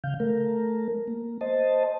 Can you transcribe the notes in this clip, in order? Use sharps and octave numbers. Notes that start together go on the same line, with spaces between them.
C#3 F5 G6
A3 A#4
A#3
C5 D#5 A5